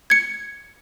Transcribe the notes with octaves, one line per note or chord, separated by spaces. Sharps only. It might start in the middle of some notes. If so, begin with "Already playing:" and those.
G#6 C#7